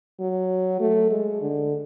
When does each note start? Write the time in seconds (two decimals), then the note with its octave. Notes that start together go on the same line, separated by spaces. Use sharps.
0.20 F#3
0.80 A3
1.11 G#3
1.41 D3